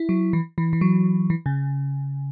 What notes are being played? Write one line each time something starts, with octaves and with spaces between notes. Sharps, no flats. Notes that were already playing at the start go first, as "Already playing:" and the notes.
Already playing: E4
F#3
E3
E3
E3
F#3
E3
C#3